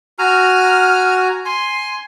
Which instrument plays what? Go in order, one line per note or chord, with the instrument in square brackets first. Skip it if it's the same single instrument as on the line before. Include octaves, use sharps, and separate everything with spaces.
[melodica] F#4 G#5 A#5 [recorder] F6
[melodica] G#5 [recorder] C6